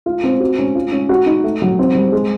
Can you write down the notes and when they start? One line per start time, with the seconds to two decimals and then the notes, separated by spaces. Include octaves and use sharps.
0.06 F4
0.24 C4
0.40 F#4
0.59 C#4
0.75 F4
0.92 C#4
1.09 F#4
1.26 D#4
1.44 A3
1.62 F#3
1.79 C4
1.95 G3
2.12 G#3